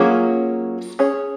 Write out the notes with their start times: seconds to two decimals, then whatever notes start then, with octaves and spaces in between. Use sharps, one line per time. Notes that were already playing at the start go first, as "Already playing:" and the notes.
Already playing: F#3 A#3 C#4 F4 G#4
0.99 C#4 G#4 C#5